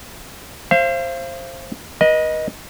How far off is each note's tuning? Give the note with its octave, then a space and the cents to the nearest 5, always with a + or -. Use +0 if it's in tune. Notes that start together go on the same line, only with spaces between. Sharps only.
C5 +20 F5 -35
B4 -40 D#5 +0